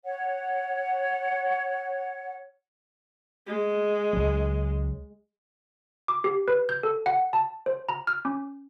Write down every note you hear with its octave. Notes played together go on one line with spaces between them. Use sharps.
C#5 F#5
G#3
C#2 F#3
D6
G4
B4
G6
A4
F#5
A5
C5
A#5
F6
C#4